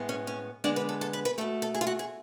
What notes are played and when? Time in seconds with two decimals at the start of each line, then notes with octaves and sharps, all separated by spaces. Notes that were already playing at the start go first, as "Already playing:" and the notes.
Already playing: A2 G#3 B3
0.09 C#4
0.27 C#4
0.64 D3 G#3 B3 D4
0.76 B4
0.89 A4
1.01 A4
1.13 B4
1.25 B4
1.38 A3 A4
1.41 B2
1.62 A4
1.75 G#4
1.81 F4
1.87 F#4
1.99 G#4